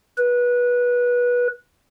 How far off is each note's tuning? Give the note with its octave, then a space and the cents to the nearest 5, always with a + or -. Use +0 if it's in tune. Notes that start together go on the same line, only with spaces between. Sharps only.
B4 -20